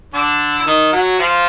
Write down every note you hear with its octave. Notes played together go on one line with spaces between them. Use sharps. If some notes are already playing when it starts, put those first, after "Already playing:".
D3 D4
E4
D#3 D#4
F#3 F#4
F3 F4